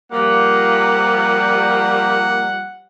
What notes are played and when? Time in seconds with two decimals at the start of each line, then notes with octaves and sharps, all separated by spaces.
0.12 F3 G3 A#3 F#5